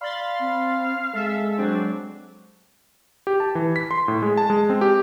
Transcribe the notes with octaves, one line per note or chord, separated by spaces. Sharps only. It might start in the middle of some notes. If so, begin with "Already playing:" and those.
D5 F5 B5 C6 A6
C4
G#3 A4 E5
F#3 C4 D4
G4
A5
E3
B6
C6
A2
G#3
A5
G#3
C4
G4